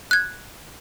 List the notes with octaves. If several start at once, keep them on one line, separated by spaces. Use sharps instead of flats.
F#6 G#6